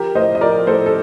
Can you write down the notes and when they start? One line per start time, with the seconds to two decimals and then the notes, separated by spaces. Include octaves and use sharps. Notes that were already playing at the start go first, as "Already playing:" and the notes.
Already playing: F3 G4 A#4
0.15 A2 C5 D#5
0.35 D#5
0.41 F3 A#4 D5
0.67 A2 A4 C5
0.86 A4